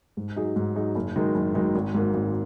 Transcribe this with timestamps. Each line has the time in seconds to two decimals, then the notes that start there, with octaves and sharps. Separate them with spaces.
0.17 G#2
0.36 F#3 D#4 G#4
0.56 G#2
0.75 F#3 D#4 G#4
0.95 F#1
1.16 F#2 D#3 G#3 D#4
1.35 F#1
1.54 F#2 D#3 G#3 D#4
1.75 G#1
1.94 G#2 F#3 A#3
2.14 G#1